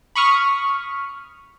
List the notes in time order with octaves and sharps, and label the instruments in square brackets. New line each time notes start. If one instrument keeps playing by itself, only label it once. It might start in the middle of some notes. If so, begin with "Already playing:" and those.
[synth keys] B5 C#6 D#6 F6